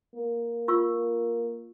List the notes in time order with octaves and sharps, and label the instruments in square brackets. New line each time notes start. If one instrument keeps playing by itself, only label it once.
[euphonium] A#3
[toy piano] F4 C#6 E6